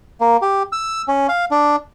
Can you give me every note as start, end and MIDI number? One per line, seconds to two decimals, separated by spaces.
0.21 0.37 58
0.42 0.63 67
0.72 1.02 88
1.08 1.27 61
1.29 1.45 77
1.51 1.76 62